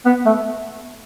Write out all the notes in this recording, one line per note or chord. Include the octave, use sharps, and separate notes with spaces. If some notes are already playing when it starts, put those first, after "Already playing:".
B3
A3